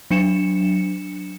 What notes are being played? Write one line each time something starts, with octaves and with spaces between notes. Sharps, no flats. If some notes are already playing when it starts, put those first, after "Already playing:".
F#3 D4 C#7 E7